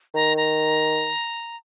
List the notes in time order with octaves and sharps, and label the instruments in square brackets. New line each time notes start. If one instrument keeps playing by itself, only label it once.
[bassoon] D#3 [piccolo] A#5
[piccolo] A#5